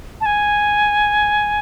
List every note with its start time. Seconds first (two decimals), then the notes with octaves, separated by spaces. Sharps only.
0.21 A5
0.26 G#5